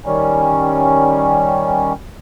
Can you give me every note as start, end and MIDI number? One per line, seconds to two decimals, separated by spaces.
0.06 1.93 51
0.06 1.93 55
0.06 1.93 61